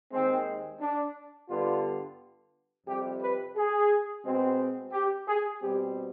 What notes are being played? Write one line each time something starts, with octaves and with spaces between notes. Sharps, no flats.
D#2 D#3 G#3 C4
D4
G2 D3 G3 B3 F4
F2 C3 G3 G4
B4
G#4
B2 G#3 C4
G4
G#4
B2 G3 C4 G4